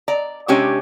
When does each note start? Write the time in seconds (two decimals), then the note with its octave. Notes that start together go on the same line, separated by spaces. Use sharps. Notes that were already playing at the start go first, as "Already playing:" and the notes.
0.08 D5 A#5
0.48 C3 G#3 C#4 D4 G4 C#5